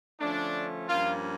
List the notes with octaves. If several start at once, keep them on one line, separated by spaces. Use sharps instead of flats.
D3 F3 A3 C#4 D4
G2 F3 A#3 C#4 F4